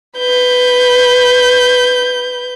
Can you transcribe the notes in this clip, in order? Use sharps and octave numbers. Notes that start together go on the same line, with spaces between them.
B4 G6